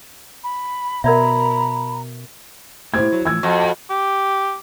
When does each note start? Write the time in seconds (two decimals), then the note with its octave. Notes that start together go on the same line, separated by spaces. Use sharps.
0.43 B5
1.04 B2 A#4 D5 E5 A#5 B5
2.94 A2 A#3 E4 G4 C5 G#6
3.12 F#3
3.25 A2 E3 F3 E6 G#6
3.43 F2 F#4 F#5 A5
3.90 G4